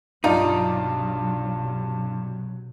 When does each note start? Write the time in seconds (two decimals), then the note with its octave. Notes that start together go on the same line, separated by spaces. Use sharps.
0.24 B1 G2 C3 F#3 D#4 F4 D5